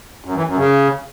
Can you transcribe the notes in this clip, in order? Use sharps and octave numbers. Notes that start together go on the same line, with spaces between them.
F#2
E3
F#2
C#3